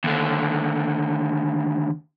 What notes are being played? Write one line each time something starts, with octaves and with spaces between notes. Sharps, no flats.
D#2 D3